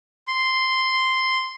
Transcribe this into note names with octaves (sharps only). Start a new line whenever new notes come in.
C6